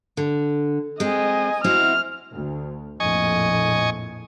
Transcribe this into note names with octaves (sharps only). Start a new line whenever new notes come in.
D3
G#3 C4 D#5 G#5
C4 E4 F#4 F6
D2
A#1 F2 A2 D#5 G#5 C#6